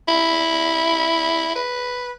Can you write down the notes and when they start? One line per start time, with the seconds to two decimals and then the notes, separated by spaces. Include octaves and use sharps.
0.08 E4
1.55 B4